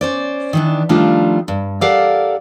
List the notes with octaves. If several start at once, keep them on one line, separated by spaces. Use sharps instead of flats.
C#4 C5 D5
D#3 E3 D4
D#3 F3 G3 A3 D4 F4
G2
G4 A4 A#4 D5 F5 F#5